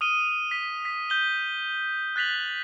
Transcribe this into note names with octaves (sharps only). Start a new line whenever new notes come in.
D#6 F6 D#7 G7
B6
B6
G6 G7
F#6 A6 B6 F7 F#7